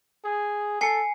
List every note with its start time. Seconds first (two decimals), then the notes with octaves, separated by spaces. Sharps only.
0.25 G#4
0.81 A4 G#5 C7 C#7